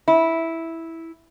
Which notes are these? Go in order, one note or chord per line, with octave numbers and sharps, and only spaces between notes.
E4